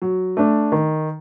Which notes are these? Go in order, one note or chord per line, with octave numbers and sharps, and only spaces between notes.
F#3
A3 D4
D#3